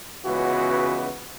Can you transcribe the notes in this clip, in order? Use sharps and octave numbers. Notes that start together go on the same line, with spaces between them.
C#2 C#3 E3 G#3 B3 F#4